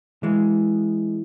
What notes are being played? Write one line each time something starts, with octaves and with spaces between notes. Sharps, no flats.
E3 G#3